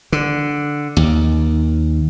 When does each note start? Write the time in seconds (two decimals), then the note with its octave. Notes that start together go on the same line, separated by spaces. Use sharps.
0.12 D3
0.97 D#2